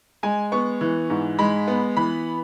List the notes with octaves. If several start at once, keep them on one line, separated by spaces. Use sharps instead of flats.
G#3 G#5
B3 C#6
E3
G#2
G#3 B5
B3
E3 B5